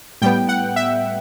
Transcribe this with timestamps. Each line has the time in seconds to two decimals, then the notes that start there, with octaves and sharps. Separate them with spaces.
0.22 A2 G3 B3 G5
0.49 F#5
0.76 E5